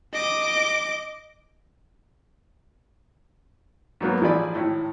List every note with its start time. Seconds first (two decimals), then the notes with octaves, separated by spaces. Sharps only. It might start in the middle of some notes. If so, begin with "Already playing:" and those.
0.13 D#5 D6
4.01 G#2 F#3 A#3 B3
4.21 A1 F3 E4 G#4 D5 B5
4.54 G#1 A2